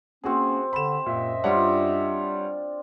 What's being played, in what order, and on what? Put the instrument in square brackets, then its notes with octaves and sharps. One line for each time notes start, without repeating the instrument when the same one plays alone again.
[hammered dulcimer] C3 C4 [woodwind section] A#3 C#4 [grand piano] F#4 G#4
[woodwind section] D3 [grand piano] B5 E7
[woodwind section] F#2 D#5 E5 [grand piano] A#2
[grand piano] G3 C#5 F#5 [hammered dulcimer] D4 F4